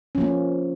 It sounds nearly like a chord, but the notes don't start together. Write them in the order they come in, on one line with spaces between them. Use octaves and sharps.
C#4 F3 A#3